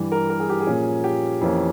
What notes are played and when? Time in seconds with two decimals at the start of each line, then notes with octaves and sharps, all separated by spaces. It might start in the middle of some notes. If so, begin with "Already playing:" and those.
Already playing: G2 E3 G3
0.12 A#4
0.30 A#4
0.40 G#4
0.50 G4
0.60 G#4
0.67 A#2 F3 A#3 C#4
1.04 G4
1.41 F2 E3 A#3 C#4